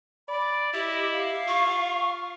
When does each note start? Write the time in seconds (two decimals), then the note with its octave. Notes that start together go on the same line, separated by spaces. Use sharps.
0.29 D5 B5
0.74 E4 G4 D#5
1.12 F5
1.48 F4 C#6